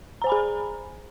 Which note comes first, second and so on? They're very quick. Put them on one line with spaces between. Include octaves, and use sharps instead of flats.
A#5 C5 G#5 B5 G#4